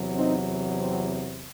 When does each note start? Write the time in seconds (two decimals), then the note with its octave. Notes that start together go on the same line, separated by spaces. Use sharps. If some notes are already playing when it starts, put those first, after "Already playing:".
Already playing: E2 C3 F#3
0.14 C4 D#4
0.78 C4